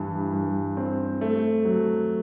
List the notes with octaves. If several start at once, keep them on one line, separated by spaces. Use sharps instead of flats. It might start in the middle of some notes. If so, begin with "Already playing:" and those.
Already playing: G2 E3
G2
C4
A3
F#3